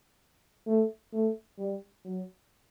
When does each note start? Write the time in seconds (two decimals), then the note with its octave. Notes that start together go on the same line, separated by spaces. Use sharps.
0.67 A3
1.13 A3
1.58 G3
2.04 F#3